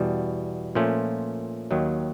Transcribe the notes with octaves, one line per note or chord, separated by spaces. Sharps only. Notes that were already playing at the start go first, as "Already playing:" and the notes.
Already playing: E2 B2 G3
A#2 F3 A3 C#4
D#2 D#3 F#3